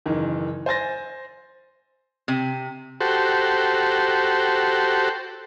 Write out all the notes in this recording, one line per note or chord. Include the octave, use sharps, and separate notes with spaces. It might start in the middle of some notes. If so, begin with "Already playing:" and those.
F#1 D#3 E3
C5 G#5 A6 A#6
C3
F#4 G4 A4 C5